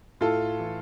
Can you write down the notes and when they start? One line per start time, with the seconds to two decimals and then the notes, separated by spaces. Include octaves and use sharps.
0.20 A2 F4 A4
0.60 E3